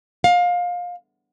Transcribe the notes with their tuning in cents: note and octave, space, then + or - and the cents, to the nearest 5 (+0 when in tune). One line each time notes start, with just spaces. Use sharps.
F5 +25